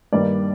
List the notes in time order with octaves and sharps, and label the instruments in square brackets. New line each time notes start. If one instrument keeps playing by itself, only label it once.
[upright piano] G2 D#3 G3 A#3 D#4 D5